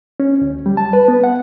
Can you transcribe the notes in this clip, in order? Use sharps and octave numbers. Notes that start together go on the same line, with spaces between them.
C#4
D2
G3
A5
B4
B3
F#5